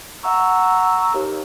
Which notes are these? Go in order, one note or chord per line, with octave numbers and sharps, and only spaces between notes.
F#5 A#5 C#6 E6
D#2